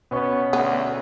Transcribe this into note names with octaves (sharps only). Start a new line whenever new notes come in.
B2 B3 C#4 C#6
D2 B3